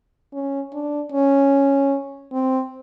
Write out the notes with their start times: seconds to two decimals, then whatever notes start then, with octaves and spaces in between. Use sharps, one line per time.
0.33 C#4
0.73 D4
1.12 C#4
2.32 C4